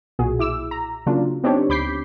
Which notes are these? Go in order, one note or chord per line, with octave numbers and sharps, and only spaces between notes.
B1 A#2 F#4 G#4
E4 D6 E6
A#5
C#3 F#3 A#3 D4 F4
B3 C4 D4 D#4 G4 C#5
D2 B5 D6 G6 B6 C7